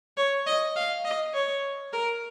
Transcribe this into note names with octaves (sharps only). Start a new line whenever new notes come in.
C#5
D#5
F5
D#5
C#5
A#4